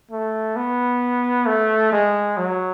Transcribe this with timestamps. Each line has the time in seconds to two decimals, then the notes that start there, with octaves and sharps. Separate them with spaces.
0.12 A3
0.56 B3
1.46 A3
1.92 G#3
2.38 F#3